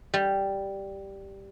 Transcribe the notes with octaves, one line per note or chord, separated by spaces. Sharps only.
G3